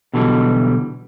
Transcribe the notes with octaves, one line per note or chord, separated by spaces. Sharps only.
B2 D3 E3 F#3 G3